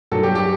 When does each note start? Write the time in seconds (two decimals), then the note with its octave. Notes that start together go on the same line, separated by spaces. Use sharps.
0.12 G2 F#3 A4
0.23 G4
0.35 G4